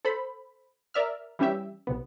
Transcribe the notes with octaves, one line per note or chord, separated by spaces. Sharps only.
A4 C5 B5
A#4 D5 E5 F6
E3 G3 C#4 G4 E5
B1 C3 B3